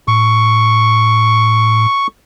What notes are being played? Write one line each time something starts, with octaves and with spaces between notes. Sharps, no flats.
A2 C#6